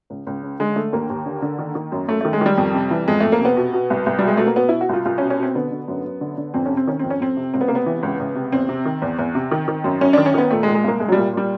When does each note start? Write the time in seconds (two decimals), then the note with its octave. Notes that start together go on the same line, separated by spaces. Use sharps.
0.10 C#2
0.27 C#2
0.43 C#3
0.60 D3 G#3
0.76 D3 A3
0.93 D#2 A#3
1.10 D#2
1.26 D3
1.42 D3
1.59 D#3
1.75 D#3
1.92 F#2
2.08 F#2 A3
2.21 D#3 A3
2.33 G#3
2.41 D#3 G3
2.58 F2
2.75 C3
2.91 E3
3.08 F2 G#3
3.20 F2 A3
3.32 A#3
3.40 C3 B3
3.57 B2
3.73 B2
3.90 C2
4.06 C2
4.19 B2 G3
4.28 G#3
4.37 B2 A3
4.47 A#3
4.56 B2 B3
4.69 B2 E4
4.81 F#4
4.89 C2 F4
5.05 C2 F4
5.18 C#4
5.22 B2
5.30 C#4
5.38 B2 C4
5.55 D3 B3
5.71 D3
5.88 F#2
6.05 F#2
6.21 D3
6.38 D3
6.54 F2 C4
6.65 C#4
6.71 C3
6.77 C4
6.87 D#3 C#4
6.99 F2 C4
7.10 C#4
7.20 F2 C4
7.37 C3
7.54 C#2 C4
7.61 B3
7.68 C3 A#3
7.75 B3
7.86 E3
8.03 C#2
8.19 C#2
8.35 C3
8.52 E2 C4
8.69 C3
8.85 D#3
9.02 E2
9.19 E2
9.35 C3
9.51 D#3
9.68 D#3
9.84 F#2
10.01 F#2 C#4
10.13 D#3 D4
10.26 C#4
10.34 D#3 B3
10.50 A#2 A3
10.63 G#3
10.67 A#2
10.75 G#3
10.84 C2 A#3
11.00 C2 G#3
11.08 F#3
11.12 A#2 G3
11.33 A#2 G3